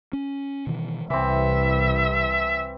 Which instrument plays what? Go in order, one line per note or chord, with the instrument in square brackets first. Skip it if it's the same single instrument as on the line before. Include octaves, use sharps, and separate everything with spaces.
[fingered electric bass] C#4
B2 D#3 E3
[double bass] C2 [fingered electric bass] C3 [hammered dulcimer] E3 C4 [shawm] E5